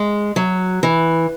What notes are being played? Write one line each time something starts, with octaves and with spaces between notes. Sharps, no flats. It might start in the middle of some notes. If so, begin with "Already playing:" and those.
Already playing: G#3
F#3
E3